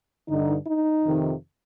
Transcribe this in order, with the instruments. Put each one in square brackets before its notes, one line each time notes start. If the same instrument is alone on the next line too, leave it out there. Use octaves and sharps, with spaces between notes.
[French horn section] G2 D3 D#4
D#4
F2 C3 D#3